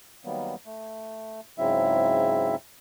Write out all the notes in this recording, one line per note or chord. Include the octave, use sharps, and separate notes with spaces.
D#3 F#3 G3 A#3 B3
A3
G#2 C#3 F#3 C4 E4 E5